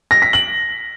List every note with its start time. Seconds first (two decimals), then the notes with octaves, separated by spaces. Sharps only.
0.11 A#6
0.22 B6
0.33 F#7